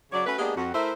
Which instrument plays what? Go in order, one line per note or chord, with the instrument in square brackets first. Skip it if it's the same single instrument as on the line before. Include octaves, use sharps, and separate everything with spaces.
[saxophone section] C#3 F#3 C#5 D5
A3 C#4 F#4 B4
G#3 A#3 B3 D4 G4 G#4
F2 F#4
A3 E4 A#4 C5 E5